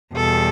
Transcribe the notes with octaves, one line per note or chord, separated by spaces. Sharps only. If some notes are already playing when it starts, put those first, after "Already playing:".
E2 B2 G3 A4